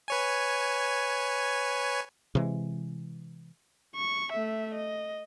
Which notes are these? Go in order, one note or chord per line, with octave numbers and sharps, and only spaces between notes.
B4 C#5 G#5
C3 E3 G#3
C#6
A3 E5
D#5